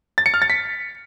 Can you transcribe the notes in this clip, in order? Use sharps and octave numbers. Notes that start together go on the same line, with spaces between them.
A6
C#7
F6
A6
B6